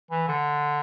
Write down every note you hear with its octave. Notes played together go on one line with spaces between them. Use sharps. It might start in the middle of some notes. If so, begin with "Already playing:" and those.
E3
D3